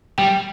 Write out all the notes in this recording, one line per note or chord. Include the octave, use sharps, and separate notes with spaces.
G3 G5